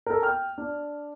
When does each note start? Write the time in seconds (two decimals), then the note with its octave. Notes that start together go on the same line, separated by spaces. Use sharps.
0.06 A4 A#4
0.22 G5 F6
0.58 D4